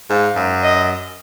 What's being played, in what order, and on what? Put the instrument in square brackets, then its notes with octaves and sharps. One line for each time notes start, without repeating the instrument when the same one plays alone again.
[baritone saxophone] G#2 [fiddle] F5
[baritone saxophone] F#2
[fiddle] D#5